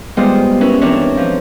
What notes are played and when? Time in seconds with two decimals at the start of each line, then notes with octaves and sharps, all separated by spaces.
0.17 G3 G#3 B3 F4 C5
0.61 C#4 E4 A#4 B4
0.81 E3 C4 D4 A#4 B4 C#5
1.17 F3